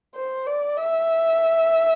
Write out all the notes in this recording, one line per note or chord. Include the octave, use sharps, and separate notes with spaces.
C5
D5
E5